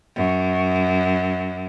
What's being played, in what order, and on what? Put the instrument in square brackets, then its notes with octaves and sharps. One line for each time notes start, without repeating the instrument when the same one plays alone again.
[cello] F#2